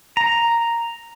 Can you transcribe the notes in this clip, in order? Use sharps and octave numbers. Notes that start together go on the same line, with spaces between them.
A#5